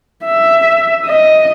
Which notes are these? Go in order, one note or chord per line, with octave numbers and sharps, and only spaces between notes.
E5
D#5